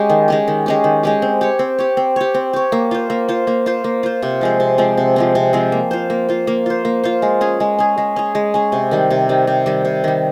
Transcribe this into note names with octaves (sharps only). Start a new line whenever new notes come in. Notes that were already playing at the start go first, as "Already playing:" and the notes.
Already playing: G#3 C#4 G4
D#3
G#3 C#4 G4
D#3
G#3 C#4 G4
D#3
G#3 C#4 G4
C4
G4 C#5
C4
G4 C#5
C4
G4 C#5
C4
G4 C#5
A#3
F4 C5
A#3
F4 C5
A#3
F4 C5
A#3
F4 C5
C3
F3 G#3 C4
C3
F3 G#3 C4
C3
F3 G#3 C4
C3
F3 G#3 C4
A#3
F4 C5
A#3
F4 C5
A#3
F4 C5
A#3
F4 C5
G#3
C#4 G#4
G#3
C#4 G#4
G#3
C#4 G#4
G#3
C#4 G#4
C3
D#3 G3
C3
D#3 G3
C3
D#3 G3
C3
D#3 G3